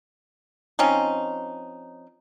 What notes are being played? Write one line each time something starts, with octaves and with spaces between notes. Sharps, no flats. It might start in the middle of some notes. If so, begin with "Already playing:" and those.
F3 C4 C#4 D#4